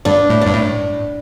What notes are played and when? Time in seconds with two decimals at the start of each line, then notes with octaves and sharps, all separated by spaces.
0.05 G2 D4
0.30 A2
0.42 G2 D4
0.53 A2